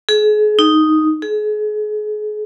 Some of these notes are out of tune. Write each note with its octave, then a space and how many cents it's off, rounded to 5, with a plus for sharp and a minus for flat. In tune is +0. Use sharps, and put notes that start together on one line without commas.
G#4 +35
D#4 +0
G#4 +35